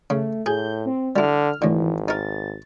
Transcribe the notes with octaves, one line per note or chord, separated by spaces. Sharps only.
C#3 A3
A2 G#4 G6
C4
D3 G3 E4 F6
G#1 A2 D3 E3
D#4 A#4 A6